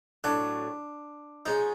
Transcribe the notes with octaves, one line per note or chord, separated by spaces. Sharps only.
A2 F#3 A3 D4
F3 G#3 C#4 D#4